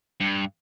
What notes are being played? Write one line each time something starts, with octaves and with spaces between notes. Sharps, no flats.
G2